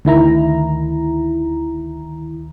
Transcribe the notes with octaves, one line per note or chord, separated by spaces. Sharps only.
D2 D#3 E4 A#5